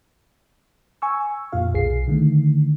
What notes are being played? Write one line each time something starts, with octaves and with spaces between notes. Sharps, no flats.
G#5 C#6 E6
F2 A#2 F4 F5
B1 G#4 C7
D3 D#3 A3